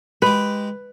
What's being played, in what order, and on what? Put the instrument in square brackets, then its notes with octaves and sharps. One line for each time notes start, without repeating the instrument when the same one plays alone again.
[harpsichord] G#3 G4 [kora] B4